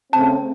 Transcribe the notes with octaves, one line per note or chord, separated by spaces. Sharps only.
C#3 A3 C4 A5